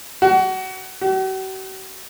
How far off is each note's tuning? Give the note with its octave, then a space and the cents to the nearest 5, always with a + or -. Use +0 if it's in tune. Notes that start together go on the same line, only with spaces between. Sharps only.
F#4 +25
F#4 +45